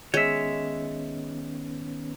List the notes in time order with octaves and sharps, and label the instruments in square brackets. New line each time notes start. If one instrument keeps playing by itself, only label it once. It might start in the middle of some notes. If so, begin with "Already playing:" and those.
[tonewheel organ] D#3 B3 C#4 [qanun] G#3 [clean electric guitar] C#5 E5